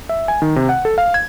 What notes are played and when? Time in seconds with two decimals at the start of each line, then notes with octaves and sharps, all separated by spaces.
0.09 E5
0.28 G#5
0.42 D#3
0.56 C3
0.69 F#5
0.85 A4
0.98 F5
1.14 G#6